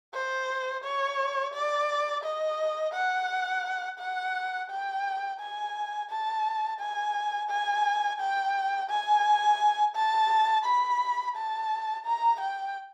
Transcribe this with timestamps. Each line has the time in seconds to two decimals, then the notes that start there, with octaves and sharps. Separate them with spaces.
0.14 C5
0.84 C#5
1.54 D5
2.24 D#5
2.94 F#5
3.99 F#5
4.70 G5
5.40 G#5
6.10 A5
6.80 G#5
7.50 G#5
8.20 G5
8.90 G#5
9.95 A5
10.65 B5
11.35 A5
12.05 A#5
12.40 G5